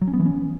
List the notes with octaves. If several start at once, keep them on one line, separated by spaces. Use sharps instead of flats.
F#3
C#4
B3
E3
C#4